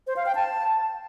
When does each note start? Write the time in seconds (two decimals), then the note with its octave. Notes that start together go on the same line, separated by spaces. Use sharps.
0.07 C5
0.16 F5
0.26 G5
0.35 A5